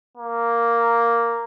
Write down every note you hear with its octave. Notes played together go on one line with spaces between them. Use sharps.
A#3